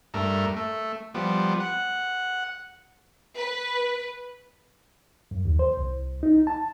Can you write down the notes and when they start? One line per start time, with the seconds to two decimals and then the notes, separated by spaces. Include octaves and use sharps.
0.14 G2 A3 A#4
0.56 A3
1.14 F3 G3 B3
1.60 F#5
3.36 B4
5.31 F#2
5.45 D#2
5.59 C5
5.77 C2
6.23 D#4
6.47 A5